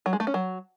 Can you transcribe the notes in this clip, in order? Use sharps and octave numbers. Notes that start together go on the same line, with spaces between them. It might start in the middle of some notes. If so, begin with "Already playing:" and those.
F#3
G#3
A3
C#4
F#3